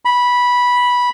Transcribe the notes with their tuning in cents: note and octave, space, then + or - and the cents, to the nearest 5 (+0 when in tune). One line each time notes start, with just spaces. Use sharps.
B5 -10